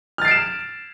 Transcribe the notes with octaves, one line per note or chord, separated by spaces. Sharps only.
F6 A6 C7 D7 E7